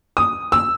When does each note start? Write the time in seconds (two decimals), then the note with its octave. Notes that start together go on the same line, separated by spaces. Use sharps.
0.17 D#6
0.52 E6